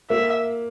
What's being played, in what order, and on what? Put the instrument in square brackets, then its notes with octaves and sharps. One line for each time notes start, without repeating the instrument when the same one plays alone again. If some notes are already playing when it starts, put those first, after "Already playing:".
[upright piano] A#3 [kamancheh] E5